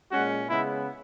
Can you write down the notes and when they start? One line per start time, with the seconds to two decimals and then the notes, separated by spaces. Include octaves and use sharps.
0.11 A#2 G#3 C#4 F#4
0.50 C#3 G#3 B3 E4